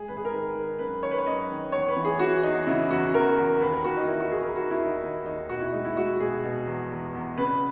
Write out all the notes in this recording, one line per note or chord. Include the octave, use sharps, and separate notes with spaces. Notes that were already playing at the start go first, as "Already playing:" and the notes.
Already playing: G#3 G#4
G#1 B4
G#4
A#4
D#3 B4
D#3
F#2 B4
D#3 C#5
B4
C#5
F#2 D#5
D#3
E2 C#5
B4
E3
G#4
E3 F#4
E2 D#4
C#3 E4
E2 F#4
E2 A#4
E2
D#2 B4
A#4
D#2 F#4
D#4
D#2 E4
F#4
D#2 G#4
A#4
D#2 F#4
E4
D#2
D#4
D#2 D#4
D#2 D#4
B2 F#4
E4
G#3 D#4
E4
G#3 F#4
B2 G#4
B2
E2
E2
E2
C#3 B4